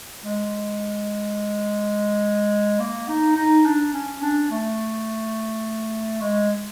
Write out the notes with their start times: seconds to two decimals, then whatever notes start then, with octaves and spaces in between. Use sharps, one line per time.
0.24 G#3
2.80 A#3
3.09 D#4
3.37 D#4
3.66 D4
3.94 C#4
4.22 D4
4.51 A3
6.22 G#3